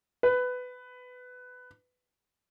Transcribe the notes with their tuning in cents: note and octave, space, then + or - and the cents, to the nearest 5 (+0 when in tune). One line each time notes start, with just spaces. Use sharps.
B4 +15